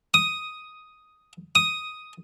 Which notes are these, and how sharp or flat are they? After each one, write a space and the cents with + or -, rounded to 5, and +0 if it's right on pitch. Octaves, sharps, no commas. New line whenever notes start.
D#6 +5
D#6 +5